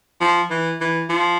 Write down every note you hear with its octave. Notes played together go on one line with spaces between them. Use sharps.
F3
E3
E3
F3